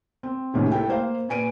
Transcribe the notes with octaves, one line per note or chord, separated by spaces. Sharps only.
C4
C#2 A2 C3 D#3
A3 E4 G5
A#3 C5 F5
A#2 B4 G#5 D7 D#7